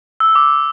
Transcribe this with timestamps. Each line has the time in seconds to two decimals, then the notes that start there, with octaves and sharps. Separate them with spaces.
0.20 E6
0.35 D6